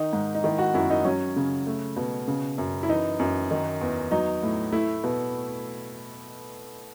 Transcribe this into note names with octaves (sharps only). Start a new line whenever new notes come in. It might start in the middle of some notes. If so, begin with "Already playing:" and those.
Already playing: D#3 D#4
G#2
D#4
D#3 E4
F#4
F#2 E4
D#4
F#3 C#4
C#3
A3
B2
C#3
F#2
E4
E3 D#4
F#2
D#3
E2
F#3 D#4
A2
A3 E4
B2